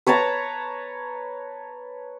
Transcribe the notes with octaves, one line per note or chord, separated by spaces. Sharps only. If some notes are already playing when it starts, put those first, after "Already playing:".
B4 C#5 A5 A#5